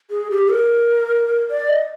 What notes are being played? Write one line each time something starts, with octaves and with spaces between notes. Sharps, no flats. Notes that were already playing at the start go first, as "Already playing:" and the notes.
G#4
G4
A#4
D5
D#5